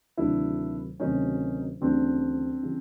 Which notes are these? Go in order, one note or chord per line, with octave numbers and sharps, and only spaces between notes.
D2 C3 D#3 F#3 D4 E4
D2 C3 D#3 F#3 C#4 D#4
D2 C#3 E3 G3 C4 D4
C#3 E3 G3